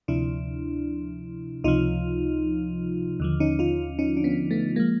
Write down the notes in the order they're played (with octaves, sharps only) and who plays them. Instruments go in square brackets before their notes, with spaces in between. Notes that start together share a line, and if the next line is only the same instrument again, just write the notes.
[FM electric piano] D2 C3 F3 D4 E4
C#2 C3 F3 D#4 F4
D#2 D3 F3
C#4 D#4
D#4 F4
C#4 D#4
D4
B3 C#4
A3 B3
F3 G#3 A#3